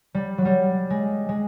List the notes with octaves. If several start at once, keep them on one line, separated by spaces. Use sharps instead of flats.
G3
F#3
G3
G#3
G#3